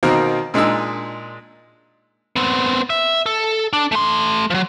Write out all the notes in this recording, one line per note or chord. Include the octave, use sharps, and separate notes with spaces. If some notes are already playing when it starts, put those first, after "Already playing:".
B2 D#3 A#3 C4
A#2 G#3 D4 D#4 E6
B3 C4
E5
A4
D4
A3 C6
F3 F#3